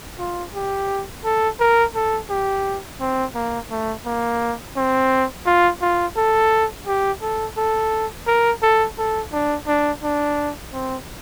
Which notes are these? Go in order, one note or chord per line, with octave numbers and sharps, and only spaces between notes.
F4
G4
A4
A#4
A4
G4
C4
A#3
A3
A#3
C4
F4
F4
A4
G4
A4
A4
A#4
A4
A4
D4
D4
D4
C4